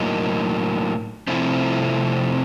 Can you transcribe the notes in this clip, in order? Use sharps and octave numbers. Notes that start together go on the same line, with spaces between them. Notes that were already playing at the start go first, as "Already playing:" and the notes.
Already playing: A2 F#3 A#3 D#4
C3 F3 A3 C4 E4